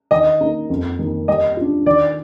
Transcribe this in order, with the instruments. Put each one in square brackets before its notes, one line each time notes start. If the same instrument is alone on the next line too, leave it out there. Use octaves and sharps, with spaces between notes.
[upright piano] D#3 [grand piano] D#5
[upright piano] A#3 D#4
F2
D#3 A#3
[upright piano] G3 [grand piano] D#5
[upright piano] D4 F4
[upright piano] D#3 [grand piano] D5